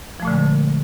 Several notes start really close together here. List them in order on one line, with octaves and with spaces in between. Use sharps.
F3 A3 A#2 D3 G#3